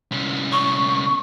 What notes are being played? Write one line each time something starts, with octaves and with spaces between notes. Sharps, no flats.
C2 C#4
C#6